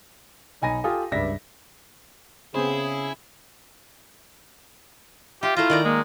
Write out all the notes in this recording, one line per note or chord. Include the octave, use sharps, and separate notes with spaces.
B1 D#4 G#5 B5 A#6 D#7
F4 G4 A4 G#5 D#6
C#2 G2 D5 E5 A#6 B6
C#3 B3 C4 E4 G#4 C5
F4 G4 E5
A3 E4 F4 C5 A#5
D#3 D5 A#5
G#3 A#3